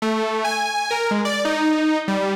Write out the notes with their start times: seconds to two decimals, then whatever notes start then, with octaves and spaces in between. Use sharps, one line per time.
0.02 A3
0.44 G#5
0.91 A#4
1.11 G#3
1.25 D5
1.45 D#4
2.08 G3